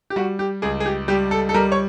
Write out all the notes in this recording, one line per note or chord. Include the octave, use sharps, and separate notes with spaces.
G4
G3 F#4
G4
C#2 G#4
G#4
G4
G3 G4
A4
A4
G3 A#4
C#5